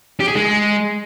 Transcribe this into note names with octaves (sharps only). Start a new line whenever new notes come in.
G4
G#4
G#3